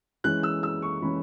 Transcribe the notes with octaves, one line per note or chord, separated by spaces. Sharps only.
E3 G#3 C#4 F#6
E6
E6
C#6
E3 G#3 C#4 B5